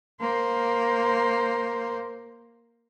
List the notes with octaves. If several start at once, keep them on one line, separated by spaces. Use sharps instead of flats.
A#3 C5